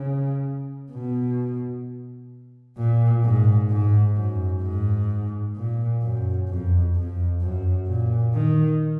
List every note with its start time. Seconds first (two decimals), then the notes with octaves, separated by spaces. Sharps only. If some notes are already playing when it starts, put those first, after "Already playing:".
Already playing: C#3
0.91 B2
2.77 A#2
3.24 G#2
3.70 G#2
4.16 F#2
4.63 G#2
5.56 A#2
6.02 F#2
6.48 F2
6.95 F2
7.42 F#2
7.88 A#2
8.34 D#3